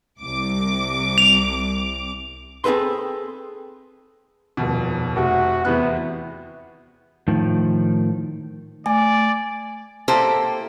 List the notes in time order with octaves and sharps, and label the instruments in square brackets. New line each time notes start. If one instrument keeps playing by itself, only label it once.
[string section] C2 D6
[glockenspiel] F7
[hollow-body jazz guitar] C4 G#4 A4 B4 C6
[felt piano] D#1 F2 B2
[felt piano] F1 C3 [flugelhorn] F#4
[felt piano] E2 C3 F#6 [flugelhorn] B3
[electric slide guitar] A2 D#3 F3
[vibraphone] A3 [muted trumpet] D5 [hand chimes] G#5
[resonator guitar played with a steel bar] A#3 C4 E4 G4 A4 C5